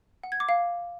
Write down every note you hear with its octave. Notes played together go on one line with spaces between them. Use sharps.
F#5
G#6
D6
F5